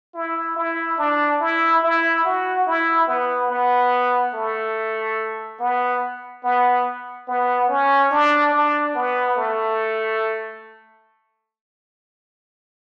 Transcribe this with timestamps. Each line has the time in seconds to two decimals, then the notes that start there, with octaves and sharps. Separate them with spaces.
0.14 E4
0.56 E4
0.98 D4
1.40 E4
1.83 E4
2.24 F#4
2.67 E4
3.07 B3
3.50 B3
4.33 A3
5.60 B3
6.44 B3
7.28 B3
7.68 C#4
8.11 D4
8.53 D4
8.95 B3
9.36 A3